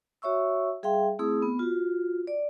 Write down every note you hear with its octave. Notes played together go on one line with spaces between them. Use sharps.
F#4 C#5 E5 C#6 E6
G3 G#4 E5 F5 G5 C6
A3 C4 E4 G#4 D#6
B3
F4 F#4
D5